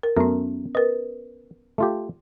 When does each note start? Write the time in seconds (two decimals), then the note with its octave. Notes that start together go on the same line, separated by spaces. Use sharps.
0.03 A#4
0.17 F#2 A3 B3 C#4 A#4
0.75 A#4 B4 D#5
1.78 A3 F4 G4